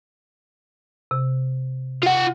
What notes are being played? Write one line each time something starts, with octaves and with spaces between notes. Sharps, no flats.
C3
F4 F#5